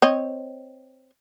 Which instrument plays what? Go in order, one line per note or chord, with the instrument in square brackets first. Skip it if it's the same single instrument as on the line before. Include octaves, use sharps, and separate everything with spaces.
[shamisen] C4 C#5 D#5